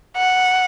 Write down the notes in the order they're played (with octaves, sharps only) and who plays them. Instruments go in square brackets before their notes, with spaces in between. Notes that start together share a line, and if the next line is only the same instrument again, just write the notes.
[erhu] F#5